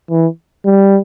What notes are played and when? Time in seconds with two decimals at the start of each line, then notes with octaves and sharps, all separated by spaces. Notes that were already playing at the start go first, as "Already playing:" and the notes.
0.11 E3
0.66 G3